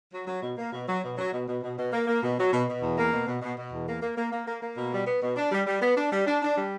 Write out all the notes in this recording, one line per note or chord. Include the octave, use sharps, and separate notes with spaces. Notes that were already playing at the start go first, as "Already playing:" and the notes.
F#3
F#3
B2
A#3
B2
F#3
B2
F#3
B2
B2
B2
B2
A#3
A#3
B2
F#3
B2
B2
E2
A#3
B2
B2
B2
B2
E2
A#3
A#3
A#3
A#3
A#3
A#3
B2
G3
B3
B2
D4
G3
G3
B3
D4
G3
D4
D4
G3